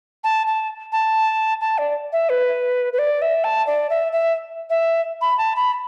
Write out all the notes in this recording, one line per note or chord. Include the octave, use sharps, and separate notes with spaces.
A5
A5
A5
A5
D5
E5
B4
B4
D5
E5
A5
D5
E5
E5
E5
B5
A5
B5